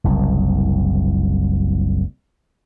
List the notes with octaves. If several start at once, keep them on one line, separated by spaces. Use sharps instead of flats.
F#1 C2